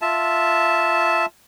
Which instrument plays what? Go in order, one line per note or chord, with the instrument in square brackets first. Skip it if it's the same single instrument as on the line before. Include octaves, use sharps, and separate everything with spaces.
[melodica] F4 E5 A5